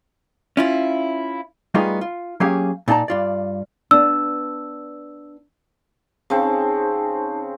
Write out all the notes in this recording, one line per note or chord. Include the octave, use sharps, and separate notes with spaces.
C#4 E4 F4
G3 A3 B3 D#4 F4 G#4
F4
F#3 A#3 C#4 G4 G#4 F5
A#2 D#4 D5 A5 A#5
G2 F4 D5
B3 D4 E6
C#3 C4 D#4 C5 A5